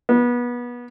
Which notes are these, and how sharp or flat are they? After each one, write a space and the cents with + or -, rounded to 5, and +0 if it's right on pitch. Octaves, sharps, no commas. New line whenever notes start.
B3 -25